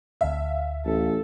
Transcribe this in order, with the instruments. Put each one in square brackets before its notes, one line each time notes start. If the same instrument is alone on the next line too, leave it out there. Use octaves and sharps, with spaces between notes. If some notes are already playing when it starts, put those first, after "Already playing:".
[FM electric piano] D2 F5 [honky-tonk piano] E5
[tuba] A1 [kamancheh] A4